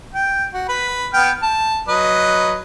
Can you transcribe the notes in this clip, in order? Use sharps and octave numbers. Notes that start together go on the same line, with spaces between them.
G5
F#4
B4 B5
B3 G5 F6
A5
F#3 B4 D#5